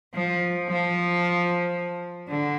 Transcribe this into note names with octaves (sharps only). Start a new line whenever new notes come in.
F3
F3
D3